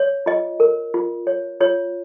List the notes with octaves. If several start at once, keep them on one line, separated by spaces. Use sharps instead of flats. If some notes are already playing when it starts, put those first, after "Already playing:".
Already playing: C#5
F4 D#5
A#4
F4
C#5
F4 C#5